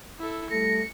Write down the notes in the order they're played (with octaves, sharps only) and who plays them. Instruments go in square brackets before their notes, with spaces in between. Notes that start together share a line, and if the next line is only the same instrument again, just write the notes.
[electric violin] E4 A4
[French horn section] G3 A3 A4 [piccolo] A#6 [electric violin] C#7